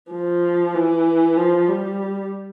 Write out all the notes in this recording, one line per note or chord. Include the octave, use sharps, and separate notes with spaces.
F3
E3
F3
G3